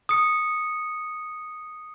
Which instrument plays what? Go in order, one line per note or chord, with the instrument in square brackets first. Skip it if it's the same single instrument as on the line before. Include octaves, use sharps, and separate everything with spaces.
[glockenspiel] D#6 C#7